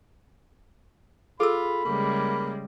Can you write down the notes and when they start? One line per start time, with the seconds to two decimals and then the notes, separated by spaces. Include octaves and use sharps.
1.40 F4 G#4 A4 B5 E6
1.85 C#3 G3 G#3 A#3